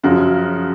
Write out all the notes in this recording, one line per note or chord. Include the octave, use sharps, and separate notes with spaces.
F#2 C#3 F3 F#4